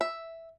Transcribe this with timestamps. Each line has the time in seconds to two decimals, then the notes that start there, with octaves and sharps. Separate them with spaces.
0.01 E5